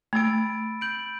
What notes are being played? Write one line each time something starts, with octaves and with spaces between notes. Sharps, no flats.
A3 B5 E6 A6 D7
G6 D7 F#7